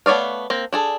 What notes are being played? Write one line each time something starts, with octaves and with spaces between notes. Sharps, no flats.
A3 B3 C#5 D5 F5
A#3 C4
D4 G#4 A4